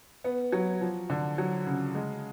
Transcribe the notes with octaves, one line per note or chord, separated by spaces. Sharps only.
B3
F#3
F3
D3
F#3
C#3
G#3